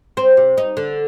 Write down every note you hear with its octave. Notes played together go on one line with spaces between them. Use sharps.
C4
C3
D#4
D3